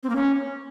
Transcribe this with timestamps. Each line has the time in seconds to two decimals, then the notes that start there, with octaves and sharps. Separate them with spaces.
0.03 C4
0.09 A#3
0.16 C#4